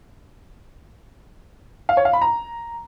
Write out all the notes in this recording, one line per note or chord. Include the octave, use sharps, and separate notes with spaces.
F5
C#5
F5
B5
A#5